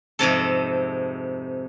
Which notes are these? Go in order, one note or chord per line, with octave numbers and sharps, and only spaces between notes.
F2 G#2 C3 A4